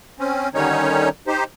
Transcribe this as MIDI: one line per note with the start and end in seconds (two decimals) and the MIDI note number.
0.20 0.49 60
0.20 0.49 61
0.55 1.09 50
0.55 1.09 51
0.55 1.09 55
0.55 1.09 61
0.55 1.09 63
0.55 1.09 73
1.27 1.44 63
1.27 1.44 67
1.27 1.44 72